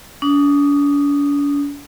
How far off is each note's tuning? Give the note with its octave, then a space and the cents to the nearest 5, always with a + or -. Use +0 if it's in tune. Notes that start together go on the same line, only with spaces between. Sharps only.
D4 -45 D#6 -15